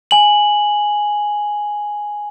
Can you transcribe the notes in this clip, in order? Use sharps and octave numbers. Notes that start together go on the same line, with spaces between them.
G#5 F#7